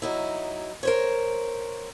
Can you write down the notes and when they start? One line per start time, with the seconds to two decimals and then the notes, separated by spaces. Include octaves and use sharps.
0.02 F#3 D#4 E4
0.83 A#4 C5 C#5